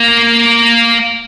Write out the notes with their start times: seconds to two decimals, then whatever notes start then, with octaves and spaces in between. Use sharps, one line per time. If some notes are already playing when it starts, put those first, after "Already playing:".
Already playing: A#3